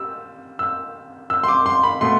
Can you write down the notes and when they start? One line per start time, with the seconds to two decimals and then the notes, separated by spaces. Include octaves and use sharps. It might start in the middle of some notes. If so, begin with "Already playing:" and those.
Already playing: G3 E6
0.59 E6
1.30 E6
1.43 C6
1.48 D6
1.66 C6
1.83 B5
2.01 B2 A3 C6